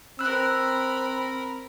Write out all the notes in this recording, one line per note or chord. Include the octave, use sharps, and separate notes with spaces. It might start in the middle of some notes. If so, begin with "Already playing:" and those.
C4 A#4 B5 E6 F#6